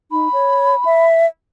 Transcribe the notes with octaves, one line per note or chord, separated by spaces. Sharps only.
D#4 B5
C#5
E5